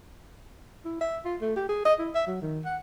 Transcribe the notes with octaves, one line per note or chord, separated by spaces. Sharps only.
E4
E5
F4
A3
G4
G#4
D#5
E4
E5
F#3
D#3
F#5